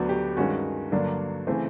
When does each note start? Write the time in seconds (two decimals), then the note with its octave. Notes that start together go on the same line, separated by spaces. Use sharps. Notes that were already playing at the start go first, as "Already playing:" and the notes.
Already playing: D2 D3 F#3 B3 D4 F#4
0.09 G4
0.37 G2 D#3 G#3 C#4 F#4
0.92 G2 D3 F#3 A#3 D4
1.47 C#3 E3 A3 C4